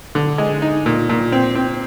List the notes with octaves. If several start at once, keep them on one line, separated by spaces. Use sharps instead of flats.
D3
G#3
D#4
A#2
A#2
C4
C4